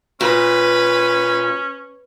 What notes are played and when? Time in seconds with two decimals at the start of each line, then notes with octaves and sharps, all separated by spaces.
0.21 A#2 C#4 B4